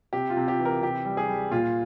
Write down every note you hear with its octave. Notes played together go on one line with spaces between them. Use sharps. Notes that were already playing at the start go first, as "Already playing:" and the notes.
C3 G4
F4
C3
G4
E3
A#4
C3 G4
G3
G#4
G3
A#2 F4